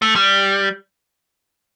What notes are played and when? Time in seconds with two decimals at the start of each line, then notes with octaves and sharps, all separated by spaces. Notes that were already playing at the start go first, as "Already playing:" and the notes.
0.02 A3
0.16 G3